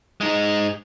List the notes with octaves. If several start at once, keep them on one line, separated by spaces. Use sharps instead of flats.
G#3 D#4